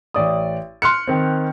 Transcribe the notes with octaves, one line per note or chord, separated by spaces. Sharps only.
A1 D5 D#6
C6 F6 F#6 C#7
D#3 C4